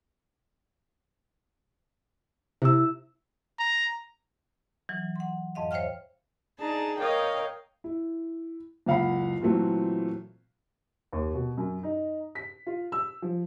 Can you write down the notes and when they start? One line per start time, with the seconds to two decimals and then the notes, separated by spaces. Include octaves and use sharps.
2.62 C3 E4 E6
3.59 A#5
4.89 E3 F#3
5.16 F#5 C6
5.55 F2 G#2 D#5 F5
5.71 C5 C#5 E5 F5 G5 F6
6.59 D4 D#4 G#4 A5 A#5
6.98 A#4 C#5 D#5 F5 G5
7.84 E4
8.86 F#1 C#2 F5 F#5 B5
9.42 A#2 E3 F#3 A3 C4
11.13 D#2
11.34 B2
11.57 F#2
11.83 D#4
12.35 B6
12.67 F4
12.92 E6
13.22 F3